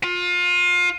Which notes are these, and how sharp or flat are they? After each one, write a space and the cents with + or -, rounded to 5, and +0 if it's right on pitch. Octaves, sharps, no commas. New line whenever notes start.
F4 +25